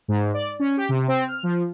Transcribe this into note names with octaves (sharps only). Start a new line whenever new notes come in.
G#2
D5
C#4
G4
C3
C4
F6
F3